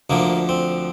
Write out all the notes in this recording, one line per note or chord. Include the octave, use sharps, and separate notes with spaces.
D2 D3 F3 A#3
C4